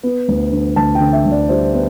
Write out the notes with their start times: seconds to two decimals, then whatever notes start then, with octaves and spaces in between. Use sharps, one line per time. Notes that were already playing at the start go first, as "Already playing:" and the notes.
0.03 B3
0.28 D2
0.52 D3
0.76 D2 A5
0.95 G5
1.00 D3
1.13 E5
1.26 D2
1.31 D5
1.49 G3 C5
1.74 B3 B4